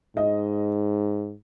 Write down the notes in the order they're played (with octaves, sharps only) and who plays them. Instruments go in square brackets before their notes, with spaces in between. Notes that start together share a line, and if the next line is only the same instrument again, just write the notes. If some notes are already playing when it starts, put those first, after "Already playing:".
[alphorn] G#2 [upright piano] D#5